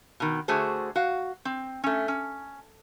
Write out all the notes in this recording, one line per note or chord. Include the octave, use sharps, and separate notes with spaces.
B2 D#3
D3 A3 F#4 G#4 C5
F#4 F5
C4
A3 C#4
C#4